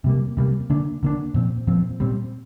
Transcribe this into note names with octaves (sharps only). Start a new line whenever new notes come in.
C3 G3 A#3
C3 G3 A#3
D3 A#3 D4
D3 A#3 D4
A#2 F3 C4
A#2 F3 C4
A#2 G3 C4